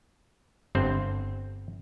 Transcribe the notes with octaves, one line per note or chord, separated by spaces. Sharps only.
G1 G2 C4 C5